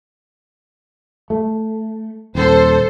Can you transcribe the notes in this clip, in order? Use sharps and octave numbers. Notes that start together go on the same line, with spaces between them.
A3
D#1 A4 C5